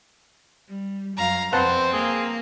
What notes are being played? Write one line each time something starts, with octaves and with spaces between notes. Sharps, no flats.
G3
F#2 F5 A#5
F2 C4 B4 C5 F#5 A5
A#3 G#4 F5